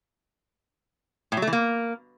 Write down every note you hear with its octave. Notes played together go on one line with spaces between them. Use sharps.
A2
F#3
A3
E3
A#3